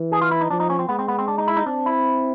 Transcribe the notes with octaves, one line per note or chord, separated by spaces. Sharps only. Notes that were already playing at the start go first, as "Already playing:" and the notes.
Already playing: E3
G#4
F4
E4
D#4
F3 D4
D#4
C#4
C4
G#3 B3
C4
B3
C4
D4
D#4
E4
D#4
C4 D4
E4